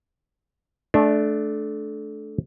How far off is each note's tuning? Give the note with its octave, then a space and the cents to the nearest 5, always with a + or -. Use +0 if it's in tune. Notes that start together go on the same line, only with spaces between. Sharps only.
A3 -20 D4 +0